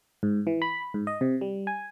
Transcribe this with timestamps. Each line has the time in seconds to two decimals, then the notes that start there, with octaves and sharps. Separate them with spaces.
0.23 G#2
0.47 E3
0.62 B5
0.94 G#2
1.07 D#5
1.21 C3
1.41 G3
1.67 G#5